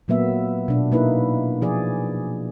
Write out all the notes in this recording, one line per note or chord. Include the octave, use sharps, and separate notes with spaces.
A#2 F#3 A#3 B3 E5
B2 D4
A#3 D#4 E4 B4
F3 G#4 D5